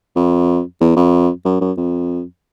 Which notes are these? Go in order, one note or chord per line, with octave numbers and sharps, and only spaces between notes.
F2
E2
F2
F#2
F#2
F2